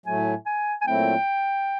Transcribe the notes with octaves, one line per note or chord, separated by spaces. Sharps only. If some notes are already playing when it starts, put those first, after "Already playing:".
A2 F#3 A3 G#5
G#5
G#5
A#2 F#3 A3 C4 E4 G5